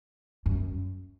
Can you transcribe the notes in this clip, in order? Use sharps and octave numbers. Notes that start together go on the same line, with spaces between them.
F#2